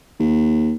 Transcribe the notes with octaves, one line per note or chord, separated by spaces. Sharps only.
D#2